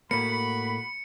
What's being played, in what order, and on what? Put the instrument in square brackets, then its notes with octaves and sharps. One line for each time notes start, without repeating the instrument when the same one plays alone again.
[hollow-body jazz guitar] A2 A#3 [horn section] F#4 B5 [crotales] C#7